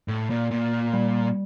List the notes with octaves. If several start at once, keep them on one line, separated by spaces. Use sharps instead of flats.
A2
A#2
A#2
G3